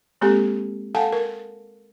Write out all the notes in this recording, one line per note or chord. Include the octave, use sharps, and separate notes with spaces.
G#3 A#3 C4 G4 A4
A4 F5 F#5 G#5 A5
A#4